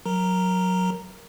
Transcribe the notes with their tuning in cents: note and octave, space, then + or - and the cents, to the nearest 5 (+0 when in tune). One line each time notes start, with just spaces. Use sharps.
F#3 -15 A#4 +0 A#5 +0